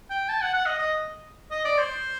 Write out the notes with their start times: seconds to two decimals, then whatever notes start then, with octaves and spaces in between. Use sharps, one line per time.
0.10 G5
0.29 A5
0.42 F#5
0.54 F#5
0.66 D#5
0.79 D#5
1.51 D#5
1.65 D5
1.78 C5